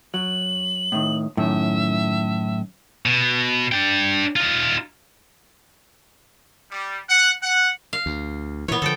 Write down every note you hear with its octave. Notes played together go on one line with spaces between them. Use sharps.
F#3 F#7
A2 D#3
F#2 A2 D#3 E5
B2
D4 G5
D#4 F4
G3
F#5
F#5
F5
D2
A#2 E3 B3 C#5
D3 E3 F3 A4 G5